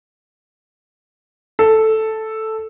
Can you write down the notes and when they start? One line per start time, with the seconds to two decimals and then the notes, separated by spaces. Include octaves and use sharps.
1.59 A4